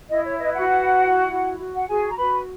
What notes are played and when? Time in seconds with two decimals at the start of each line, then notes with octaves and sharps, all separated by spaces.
0.09 E4 D#5
0.25 C#5
0.39 B4 D#5
0.54 F#4 F#5
0.68 E4
0.99 E4
1.29 F#4
1.58 F#4
1.75 F#5
1.88 F#4 G#4 G#5
2.10 A#5
2.17 F#4 B4 B5